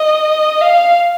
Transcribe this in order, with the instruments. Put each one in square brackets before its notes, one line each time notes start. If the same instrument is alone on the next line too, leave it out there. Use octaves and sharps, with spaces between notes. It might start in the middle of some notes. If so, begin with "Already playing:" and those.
Already playing: [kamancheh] D#5
F5